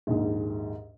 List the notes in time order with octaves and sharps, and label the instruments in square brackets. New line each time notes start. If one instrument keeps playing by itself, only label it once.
[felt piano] A#1 D#2 G#2